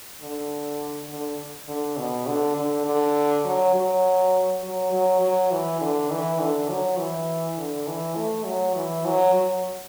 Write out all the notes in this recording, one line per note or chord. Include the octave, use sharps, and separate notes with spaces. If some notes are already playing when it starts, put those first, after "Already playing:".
D3
D3
D3
B2
D3
D3
D3
F#3
F#3
F#3
F#3
F#3
E3
D3
E3
D3
F#3
E3
D3
E3
A3
F#3
E3
F#3
F#3